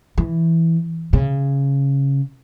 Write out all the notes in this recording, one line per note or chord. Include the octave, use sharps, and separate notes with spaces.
E3
C#3